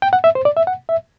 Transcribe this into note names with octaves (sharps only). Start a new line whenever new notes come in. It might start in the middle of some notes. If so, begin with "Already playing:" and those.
G5
F#5
E5
C5
D5
E5
F#5
E5